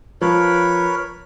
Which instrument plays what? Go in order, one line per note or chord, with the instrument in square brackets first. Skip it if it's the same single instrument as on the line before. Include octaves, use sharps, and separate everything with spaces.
[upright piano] F3 [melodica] A#4 B4 C#5